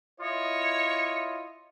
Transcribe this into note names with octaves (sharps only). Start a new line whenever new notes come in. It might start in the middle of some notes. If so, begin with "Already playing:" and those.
E4 F4 C#5 D#5